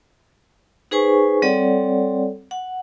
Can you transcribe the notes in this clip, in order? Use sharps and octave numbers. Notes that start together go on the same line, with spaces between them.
D#4 G#4 B4 C5 G#5 C#6
G3 C4 A4 C#5 D5 F#5
F#5